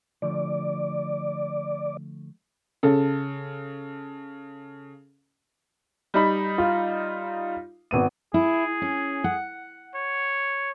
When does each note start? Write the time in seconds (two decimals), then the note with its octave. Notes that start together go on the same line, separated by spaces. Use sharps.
0.22 D3 F3 A3 D5
2.83 C#3 A4
6.14 G3 D#4 B5
6.58 F4
7.91 G#1 B3 D#7
8.34 E4 G#4
8.82 C#4
9.24 F#5
9.95 C#5